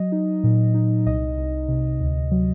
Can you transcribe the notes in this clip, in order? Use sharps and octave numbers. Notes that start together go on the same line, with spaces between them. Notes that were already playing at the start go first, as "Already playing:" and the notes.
Already playing: F#3 D#5
D#4
A#2
D#4
C2 D#5
C2
C3
D2
F#3